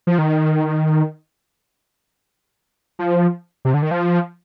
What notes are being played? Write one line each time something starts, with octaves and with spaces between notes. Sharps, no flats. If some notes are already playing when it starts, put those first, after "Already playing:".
F3
D#3
F3
C3
D3
D#3
F3